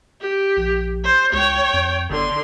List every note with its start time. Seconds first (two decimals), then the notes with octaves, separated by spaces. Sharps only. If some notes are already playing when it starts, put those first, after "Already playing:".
0.21 G4
0.57 A#1
1.04 C5
1.33 C#2 C#5 G5
1.73 F2
2.10 G1 D3 C6